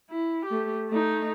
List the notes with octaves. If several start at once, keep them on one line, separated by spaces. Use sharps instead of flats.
E4
A3 G4
A3 D#4